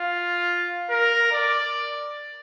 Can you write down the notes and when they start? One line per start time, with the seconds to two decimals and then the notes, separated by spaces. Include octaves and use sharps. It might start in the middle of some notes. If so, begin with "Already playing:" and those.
Already playing: F4
0.90 A#4
1.32 D5